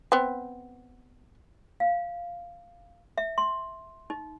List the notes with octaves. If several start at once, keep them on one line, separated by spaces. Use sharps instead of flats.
B3 C4
F5
E5
C6
D#4